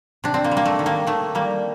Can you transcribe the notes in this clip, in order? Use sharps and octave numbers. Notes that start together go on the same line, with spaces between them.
C3 D4
C4
A#3
G3
A#3
A3
D#3
A#3
D#3 A3
G3 A#3